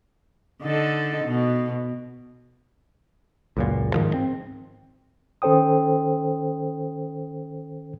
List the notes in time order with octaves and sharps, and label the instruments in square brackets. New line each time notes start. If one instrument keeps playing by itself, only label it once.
[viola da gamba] D3 D#4 A4
B2
[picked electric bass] C#2 F#2 A#2
G#2 D#3 F3
C4
[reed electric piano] D#3 C#4 A4 C5 G5 D#6